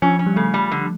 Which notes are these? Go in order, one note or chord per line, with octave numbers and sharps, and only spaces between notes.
F3 C#4
C#4
G3
C#3 A3
G3
D3